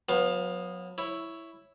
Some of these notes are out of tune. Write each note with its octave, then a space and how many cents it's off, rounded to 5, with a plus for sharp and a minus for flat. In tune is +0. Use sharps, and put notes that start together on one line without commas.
F#3 -35 B3 +0 F5 +20
E4 +0 C#5 +0